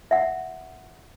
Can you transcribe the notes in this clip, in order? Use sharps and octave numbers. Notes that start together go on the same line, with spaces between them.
E5 F#5